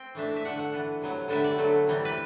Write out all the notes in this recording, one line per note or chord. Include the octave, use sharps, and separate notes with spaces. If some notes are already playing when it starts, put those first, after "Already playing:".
Already playing: C4 G5
E3 A3 D4 E5
E5
D3 A3 D4 F#5
F#5
E3 B3 D4
C3 F#3 B3
D3 G3 B3 D4 E5
D5
D3 F#3 A3
C3 E3 G3
B4